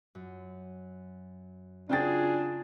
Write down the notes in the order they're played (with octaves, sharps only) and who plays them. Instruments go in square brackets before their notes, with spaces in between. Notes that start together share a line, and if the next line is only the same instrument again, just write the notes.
[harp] F#2
[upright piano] C#3 G5 A6 [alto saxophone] D4 [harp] F4 [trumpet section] F#4 G#4